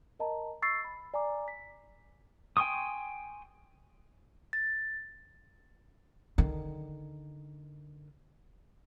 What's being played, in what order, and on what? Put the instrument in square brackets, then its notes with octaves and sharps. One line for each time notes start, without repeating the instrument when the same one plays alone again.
[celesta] A#4 D#5 A5 A#5
C#6 E6 A6 C7
B5
D5 G#5 A#5 D6
B6
[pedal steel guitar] G5 G#5 C6 C#6 D#6
[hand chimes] A6
[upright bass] D3 D#3